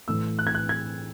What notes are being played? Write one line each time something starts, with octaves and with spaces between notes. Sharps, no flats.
A2 E3 E6
F#6
G#6
F#6
G#6